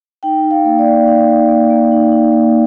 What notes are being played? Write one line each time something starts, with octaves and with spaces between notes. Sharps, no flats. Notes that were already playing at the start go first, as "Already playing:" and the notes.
D#4 G5
D#4
F5
A#3
D5
A#3
D#4 F5
D#4
A#3
A#3
D#4
D#4
A#3